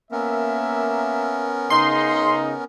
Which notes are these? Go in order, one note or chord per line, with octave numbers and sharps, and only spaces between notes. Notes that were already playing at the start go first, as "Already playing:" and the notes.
A#3 B3 C#4 A#4 E5
C#3 D#4 C6